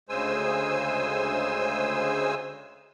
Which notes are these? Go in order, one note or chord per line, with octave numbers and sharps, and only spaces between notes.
D2 C#3 G#3 C5 G#5 E6